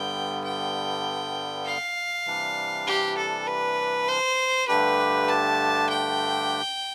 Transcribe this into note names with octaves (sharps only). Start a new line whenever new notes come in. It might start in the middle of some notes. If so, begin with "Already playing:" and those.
Already playing: G2 D3 G3 B3 G5
G5
F5
C3 E3 G3 D4
G4
A4
B4
C5
G2 D3 A3 D4 G4 B4
A5
G5